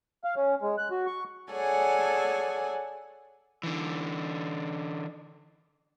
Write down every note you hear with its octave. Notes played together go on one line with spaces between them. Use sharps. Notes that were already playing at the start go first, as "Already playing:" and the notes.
F5
C#4
G#3
F#6
F#4
C#6
G#4 A4 C#5 D5 F#5 G#5
D3 E3